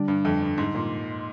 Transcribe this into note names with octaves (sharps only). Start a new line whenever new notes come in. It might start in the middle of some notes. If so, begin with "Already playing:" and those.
Already playing: D3 G3 D4
G2
F2
G2
G#2
A#2